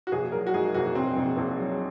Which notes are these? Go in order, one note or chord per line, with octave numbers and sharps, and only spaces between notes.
F#4
A#1 G#4
F#3 A#4
F#4
G#2 G#4
A#1 F#4
A#1 C4
A#1
A#1
F#3